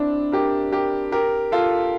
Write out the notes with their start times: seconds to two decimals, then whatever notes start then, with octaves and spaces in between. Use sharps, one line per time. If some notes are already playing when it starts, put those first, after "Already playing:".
Already playing: C4 D4 E4
0.32 G4 A#4
0.72 G4 A#4
1.12 G4 A#4
1.52 F4 A4